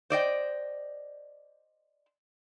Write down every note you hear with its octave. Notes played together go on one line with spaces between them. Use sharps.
C5 D5 D#5 G5